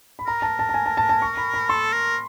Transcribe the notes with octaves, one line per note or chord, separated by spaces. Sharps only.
B5
A#4 A#5
A5
A5
A5
G#5
A5
A5
A5
C#6
B5
B5
A4 C6
A#4